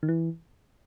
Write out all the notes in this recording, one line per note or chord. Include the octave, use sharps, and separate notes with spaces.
D#3
E3